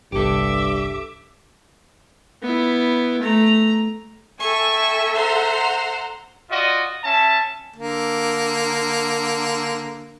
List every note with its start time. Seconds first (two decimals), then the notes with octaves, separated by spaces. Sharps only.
0.12 G1 C2 G2 G4 A4 E5 D6
2.42 B3 E4
3.22 A3 A#5
4.40 A4 E5 G5 G#5 C#6
5.15 C5 F#5 A#5 C6
6.50 F4 F#4 D5 D#5
7.03 C#4 E5 A5
7.76 D3 A#3